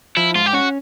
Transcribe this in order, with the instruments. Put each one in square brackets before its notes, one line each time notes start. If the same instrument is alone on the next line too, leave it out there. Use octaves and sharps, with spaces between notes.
[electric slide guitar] F3 [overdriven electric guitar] E4
[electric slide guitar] G#2 [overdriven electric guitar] F4
[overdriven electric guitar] G4
[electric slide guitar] C#4 [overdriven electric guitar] F#4